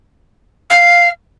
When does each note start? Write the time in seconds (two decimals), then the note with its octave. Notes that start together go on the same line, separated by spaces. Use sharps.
0.70 F5